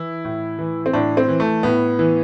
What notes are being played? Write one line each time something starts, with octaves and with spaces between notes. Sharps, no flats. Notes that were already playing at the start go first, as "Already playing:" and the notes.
Already playing: E3 E4
A2
E3
C4
A2 D4
C4
E3
A3
A2 B3
E3